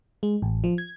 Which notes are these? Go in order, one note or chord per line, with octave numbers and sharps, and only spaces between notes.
G#3
A1
F3
G#6